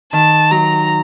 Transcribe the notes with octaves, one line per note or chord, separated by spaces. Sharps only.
D#3 A5
F#3 A#5